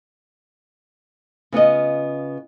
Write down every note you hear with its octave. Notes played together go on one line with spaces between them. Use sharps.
C#3 B3 F4 D#5